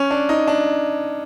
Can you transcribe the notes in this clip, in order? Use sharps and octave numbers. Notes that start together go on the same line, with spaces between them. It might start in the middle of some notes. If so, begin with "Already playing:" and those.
Already playing: C#4
D4
D#4
D4